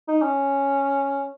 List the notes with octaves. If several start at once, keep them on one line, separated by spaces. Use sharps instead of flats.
D#4
C#4